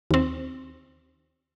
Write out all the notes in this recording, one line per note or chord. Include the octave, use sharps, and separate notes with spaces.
D#2 C4